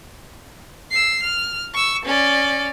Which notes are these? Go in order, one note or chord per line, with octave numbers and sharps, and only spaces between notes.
E6 C7
F6
C#6 E6
C#4 D5